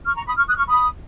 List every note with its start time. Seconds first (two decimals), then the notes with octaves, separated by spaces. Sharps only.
0.06 C#6 F6
0.16 A#5 C#6
0.27 B5 D#6
0.36 C#6 F6
0.48 D#6 F#6
0.57 C#6 F6
0.68 B5 D#6